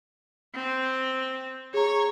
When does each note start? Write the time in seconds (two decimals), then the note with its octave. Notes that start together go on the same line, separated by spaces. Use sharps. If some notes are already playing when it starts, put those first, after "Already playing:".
0.54 C4
1.74 G#4 C#5 A#5